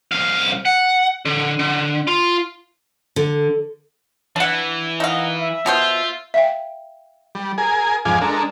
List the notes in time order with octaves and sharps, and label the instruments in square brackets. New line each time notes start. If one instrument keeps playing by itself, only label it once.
[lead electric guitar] C2 F5
F#5
D3
D3
F4
[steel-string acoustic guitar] D3
[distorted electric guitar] E3 [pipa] D4 F#5
[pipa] D#4 F5 [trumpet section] A#4 D#5 F#5
[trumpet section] E5
[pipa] B2 B3 C5 [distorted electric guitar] F4
[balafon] E5 F5 G5
[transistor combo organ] G3
G#4 A#4 G#5
F2 G#2 G#4 F5 G#5 D6
G#3 D4 A4 A#4